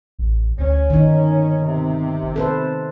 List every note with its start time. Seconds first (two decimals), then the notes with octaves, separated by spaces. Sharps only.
0.19 A1
0.58 D2 C#4
0.90 G1 D#3 D#4
1.65 C3
2.36 A4 B4 C5